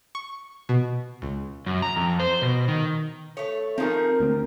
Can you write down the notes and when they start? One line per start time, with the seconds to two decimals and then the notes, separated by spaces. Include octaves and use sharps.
0.15 C#6
0.69 B2
1.22 C#2
1.66 F#2
1.82 A#5
1.96 F2
2.20 C5
2.42 B2
2.68 D#3
3.37 A3 C#5
3.78 F3 C4 D#4 G#4 A#4
4.20 D2 C4